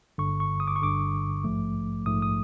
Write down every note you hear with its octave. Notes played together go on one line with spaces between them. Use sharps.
G1 G2 D3 C#6
C#6
D#6
D6
C#6
G1 G2 D3 D6
A#1 G#2 F3 A3
A#1 G#2 F3 A3 D#6
D#6